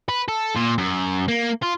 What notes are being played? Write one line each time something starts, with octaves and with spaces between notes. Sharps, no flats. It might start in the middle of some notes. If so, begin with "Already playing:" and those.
B4
A4
A#2
F#2
A#3
F4